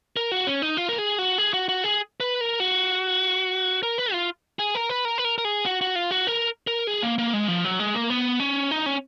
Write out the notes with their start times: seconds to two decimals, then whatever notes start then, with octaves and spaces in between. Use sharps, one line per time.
0.17 A#4
0.32 F#4
0.47 C#4
0.62 D#4
0.77 F4
0.89 A#4
0.98 G#4
1.18 F#4
1.38 G#4
1.54 F#4
1.69 F#4
1.84 G#4
2.20 B4
2.41 A#4
2.60 F#4
3.83 A#4
3.98 B4
4.13 F4
4.59 G#4
4.75 A#4
4.90 B4
5.05 A#4
5.18 B4
5.25 A#4
5.38 A#4
5.45 G#4
5.65 F#4
5.81 F#4
5.96 F4
6.11 F#4
6.27 A#4
6.67 A#4
6.87 G#4
7.03 A#3
7.18 A#3
7.33 G#3
7.48 F3
7.65 F#3
7.80 G#3
7.95 A#3
8.10 B3
8.40 C#4
8.71 D#4
8.86 C#4